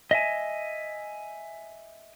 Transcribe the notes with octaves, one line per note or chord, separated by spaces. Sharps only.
D#5 E5 G#5